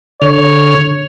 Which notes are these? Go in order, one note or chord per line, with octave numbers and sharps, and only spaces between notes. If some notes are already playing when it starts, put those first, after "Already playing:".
D3 C#5 F6